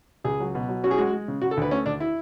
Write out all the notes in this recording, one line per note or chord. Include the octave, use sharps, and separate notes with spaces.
C#2 G#4
F#3
B2
F#3
C#4 F#4
G#4
G#3 F#4
G#3
C#3
C#3 F#4
A4
D2 B4
A3 C#4
D2 D4
E4